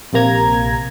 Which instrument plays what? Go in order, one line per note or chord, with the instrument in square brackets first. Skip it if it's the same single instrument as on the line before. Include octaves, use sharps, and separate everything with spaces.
[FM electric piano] A#1 C3 A#3 A#5 G#6